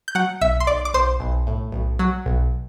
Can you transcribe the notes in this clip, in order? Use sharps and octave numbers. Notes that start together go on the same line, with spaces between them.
G6
F#3 F#5 F#6
B1 E5 E6
C6
B1 D5 D6
D6
B1 C5 C6
B1
A2
B1
F#3
B1